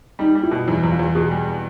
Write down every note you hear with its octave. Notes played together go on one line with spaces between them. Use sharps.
G3 D#4
G3
E4
B2
E2 E4
E2
F4
E2
B2 G#4
G3